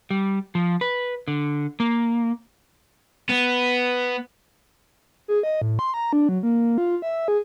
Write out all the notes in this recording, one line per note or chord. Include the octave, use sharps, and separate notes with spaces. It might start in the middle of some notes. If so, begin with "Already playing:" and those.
G3
F3
B4
D3
A#3
B3
G#4
D#5
A2
C6
A#5
D4
F#3
A#3
F4
E5
G#4